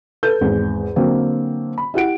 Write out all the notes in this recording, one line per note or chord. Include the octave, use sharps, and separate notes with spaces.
A4 B4 G6
G#1 E2
D3 F#3 A#3 C4
B5
E4 G4 F#5 D7